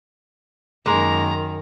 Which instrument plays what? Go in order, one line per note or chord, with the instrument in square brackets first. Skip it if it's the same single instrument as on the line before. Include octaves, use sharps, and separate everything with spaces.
[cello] F#2 D#3 [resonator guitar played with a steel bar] G#3 A#3 [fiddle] A#5